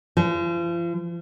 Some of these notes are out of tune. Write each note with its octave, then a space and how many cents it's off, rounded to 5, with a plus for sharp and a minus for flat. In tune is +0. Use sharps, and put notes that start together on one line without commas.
F3 -40